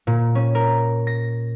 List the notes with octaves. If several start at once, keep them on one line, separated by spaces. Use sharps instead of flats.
A#2
C#4
A#4
A#6